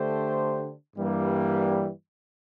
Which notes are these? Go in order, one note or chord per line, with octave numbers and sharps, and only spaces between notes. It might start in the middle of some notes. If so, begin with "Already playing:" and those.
Already playing: D3 A3 D4 G4 C5
G2 E3 G3 A#3